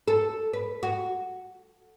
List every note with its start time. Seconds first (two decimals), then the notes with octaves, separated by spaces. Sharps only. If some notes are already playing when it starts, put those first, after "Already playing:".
0.08 A4
0.53 B4
0.83 F#4